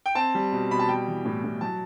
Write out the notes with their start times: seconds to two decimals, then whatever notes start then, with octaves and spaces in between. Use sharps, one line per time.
0.06 G5
0.15 C4 A5
0.35 G3
0.52 B2
0.71 B2 B5
0.79 A5
0.89 G3 G5
1.07 E3
1.25 A2
1.44 A2
1.61 F#3 A5